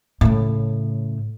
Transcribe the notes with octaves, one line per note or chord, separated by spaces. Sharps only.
A2 C#3